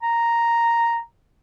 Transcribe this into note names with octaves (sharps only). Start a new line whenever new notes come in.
A#5